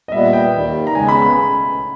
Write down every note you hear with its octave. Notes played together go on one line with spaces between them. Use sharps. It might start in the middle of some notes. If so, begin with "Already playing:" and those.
D#5
A#2 G3 B3 E5
G5
D#2 D#3 G3
A#5
C#3 G#3 B3 G#5
B5
B5